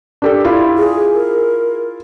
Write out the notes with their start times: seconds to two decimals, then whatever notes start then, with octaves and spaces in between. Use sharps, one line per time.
0.22 D4 G4 A4
0.45 E4 F4
0.78 G#4
1.14 A#4